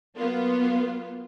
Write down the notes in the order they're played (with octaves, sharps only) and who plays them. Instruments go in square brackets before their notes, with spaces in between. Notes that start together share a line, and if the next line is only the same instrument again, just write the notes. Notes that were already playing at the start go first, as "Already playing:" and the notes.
[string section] F#3 A#3 B3 F4